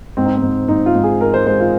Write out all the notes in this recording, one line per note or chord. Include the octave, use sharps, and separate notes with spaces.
G#2 C4
D#4
C4
G#2
G#2 D#4
F4
G#2
G#4
G#3 A#4
C5
G#3 C5
F4